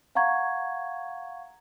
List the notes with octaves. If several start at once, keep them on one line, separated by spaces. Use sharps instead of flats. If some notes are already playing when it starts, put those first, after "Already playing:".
F5 F#5 A#5 C#6 G#6